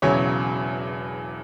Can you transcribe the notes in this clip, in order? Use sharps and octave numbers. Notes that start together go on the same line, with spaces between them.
E1 E2 C#3 F#3 C#5